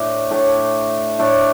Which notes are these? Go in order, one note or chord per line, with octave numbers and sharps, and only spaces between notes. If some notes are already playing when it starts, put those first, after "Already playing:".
Already playing: A2 A3 D4
A2 A3 D4
A2 A3 D4